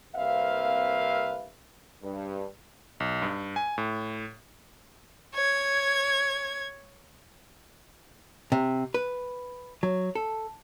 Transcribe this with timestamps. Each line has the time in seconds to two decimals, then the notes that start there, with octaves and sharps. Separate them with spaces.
0.16 C2 A#3 C4 B4 E5 F5
2.02 G2
3.00 B1
3.22 G2
3.56 G#5
3.78 A2
5.35 C#5 G#6
8.52 C3
8.94 B4
9.83 F#3
10.15 A4